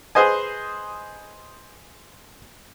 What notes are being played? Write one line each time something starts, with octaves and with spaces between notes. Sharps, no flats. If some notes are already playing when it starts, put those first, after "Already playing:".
G#4 B4 C5 D#5 G#5